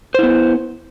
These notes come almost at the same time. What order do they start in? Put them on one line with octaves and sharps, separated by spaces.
C5 E4 B3